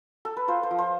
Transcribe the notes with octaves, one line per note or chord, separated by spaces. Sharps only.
A4
B4
F4 C5
C5
F3
C5